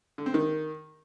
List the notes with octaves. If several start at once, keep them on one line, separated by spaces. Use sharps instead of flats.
D3
C4
D#3